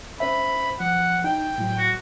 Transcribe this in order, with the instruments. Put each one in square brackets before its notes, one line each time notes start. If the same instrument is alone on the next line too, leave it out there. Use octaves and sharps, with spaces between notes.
[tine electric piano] C#4 C5 E5 [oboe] B5
[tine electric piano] F3 [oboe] F#5
[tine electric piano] D#4 [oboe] G5
[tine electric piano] A2 F#3
[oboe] F#4